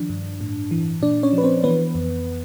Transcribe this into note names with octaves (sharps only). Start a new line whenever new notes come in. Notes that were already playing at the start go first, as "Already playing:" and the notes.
Already playing: D#3 F3 D4
G2
A2
E3
A#2 D4 D5
C#4 C#5
F3
B4
C4 C5
E3 B3 B4
F2